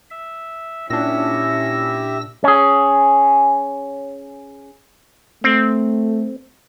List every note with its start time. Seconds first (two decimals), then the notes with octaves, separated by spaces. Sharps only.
0.11 E5
0.90 A#2 C#4 D4 E4 G4 E5 E6 A#6
2.44 C#4 G#4
5.44 A3 C4